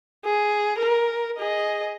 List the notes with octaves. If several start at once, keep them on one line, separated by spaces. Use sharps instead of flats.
G#4
A#4
G#4 D#5